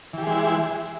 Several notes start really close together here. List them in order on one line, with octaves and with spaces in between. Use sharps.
E3 G4 G#4 G#3 E4